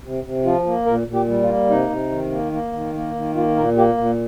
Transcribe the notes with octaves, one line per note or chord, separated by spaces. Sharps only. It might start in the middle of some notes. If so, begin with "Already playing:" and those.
C3
C3
F3 F4
A#3
A#2 A#4
A#2
G4
G3
F4
A#3
C3 D#4
C3
D#3
A#3
A#3
D#3
A#3
D#3
A#3 F4
A#2 A#4
A#3 G4
A#2